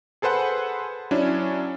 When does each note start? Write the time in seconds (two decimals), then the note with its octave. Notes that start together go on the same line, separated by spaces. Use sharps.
0.22 G#4 A4 B4 C5 F#5
1.11 F#3 C#4 D4 E4